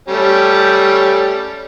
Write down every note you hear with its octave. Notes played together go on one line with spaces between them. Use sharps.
G3 A3 C#4